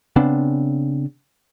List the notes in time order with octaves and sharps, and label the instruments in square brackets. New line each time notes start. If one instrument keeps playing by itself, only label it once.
[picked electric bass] C#3 B3 C4 D4